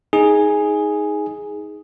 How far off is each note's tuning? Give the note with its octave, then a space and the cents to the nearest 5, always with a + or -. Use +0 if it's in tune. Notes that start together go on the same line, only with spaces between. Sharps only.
D#4 +15 G#4 +0